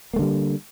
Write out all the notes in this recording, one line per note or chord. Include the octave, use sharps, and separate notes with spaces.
D3 G3 A3 A#3